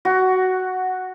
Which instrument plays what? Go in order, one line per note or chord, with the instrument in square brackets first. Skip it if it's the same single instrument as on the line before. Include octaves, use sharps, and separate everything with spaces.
[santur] F#4